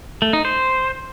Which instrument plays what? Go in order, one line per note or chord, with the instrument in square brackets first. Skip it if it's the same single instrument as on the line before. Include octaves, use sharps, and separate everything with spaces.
[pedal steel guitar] A3
D#4
C5